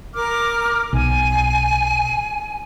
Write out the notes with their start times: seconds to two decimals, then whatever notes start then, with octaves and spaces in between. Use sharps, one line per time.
0.15 A#4 D6 F6
0.93 B1 G#5